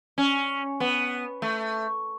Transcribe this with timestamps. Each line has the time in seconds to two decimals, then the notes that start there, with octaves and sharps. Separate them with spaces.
0.18 C#4
0.80 B3
1.42 A3